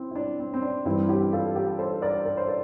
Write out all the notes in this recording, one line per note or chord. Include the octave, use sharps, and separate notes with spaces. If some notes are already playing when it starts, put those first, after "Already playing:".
Already playing: C4 E4
E4
D4
C4
C4
D4
G2 E3 G3 C4 E4
E4 G4
F4 A4
G4 A#4
A4 C5
A#4 D5
A#4 D5
C5
A#4 D5